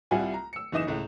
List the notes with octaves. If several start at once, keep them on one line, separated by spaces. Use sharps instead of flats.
C2 G3 E4 F4 F#5 G#5
A#5
E6 C#7
F#1 E3 D#4 D#5 D#6 E7
C#2 A2